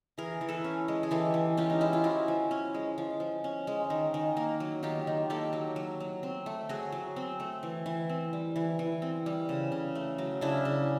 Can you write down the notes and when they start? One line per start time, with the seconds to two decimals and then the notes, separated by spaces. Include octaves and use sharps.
0.18 E3 G#4 A#4
0.41 E3
0.49 A4 B4
0.64 C#4
0.88 G#3
1.03 G#4
1.11 E3 G4 A4
1.34 E3
1.57 C#4 F4 G4
1.70 D#4
1.81 G#3 E4
1.93 F4
2.04 F3 E4 F#4
2.28 F3
2.51 C#4
2.74 G#3
2.98 F3
3.20 F3
3.44 C#4
3.67 G#3
3.90 D#3
4.14 D#3
4.37 A#3
4.60 F#3
4.83 D#3 F4 G4
5.07 D#3
5.30 A#3 G4 A4
5.53 F#3
5.76 F#3
6.00 F#3
6.23 C4
6.46 A3
6.69 F#3 F#4 G#4
6.92 F#3
7.16 C4
7.40 A3
7.63 E3
7.86 E3
8.09 C4
8.33 G3
8.56 E3
8.79 E3
9.02 C4
9.26 G3
9.49 C#3
9.72 C#3
9.95 A3
10.18 F#3
10.41 C#3 D4 E4
10.65 C#3